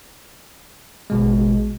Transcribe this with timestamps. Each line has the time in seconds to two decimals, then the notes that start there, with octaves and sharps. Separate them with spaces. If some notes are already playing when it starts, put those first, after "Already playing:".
1.10 A1 B2 G#3